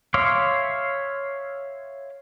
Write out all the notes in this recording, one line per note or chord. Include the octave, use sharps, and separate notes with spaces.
C#5 E5 F5 C6 D6